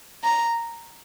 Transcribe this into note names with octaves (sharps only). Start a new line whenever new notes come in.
A#5